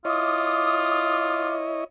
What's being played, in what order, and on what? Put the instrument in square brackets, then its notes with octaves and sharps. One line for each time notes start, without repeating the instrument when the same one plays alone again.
[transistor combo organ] E4 C#5 D#5 [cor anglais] F4 [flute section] D6 D#6